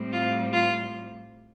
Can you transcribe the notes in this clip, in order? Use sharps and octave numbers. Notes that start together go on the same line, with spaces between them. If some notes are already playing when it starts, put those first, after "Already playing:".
Already playing: A2 G3 C4
F4
F4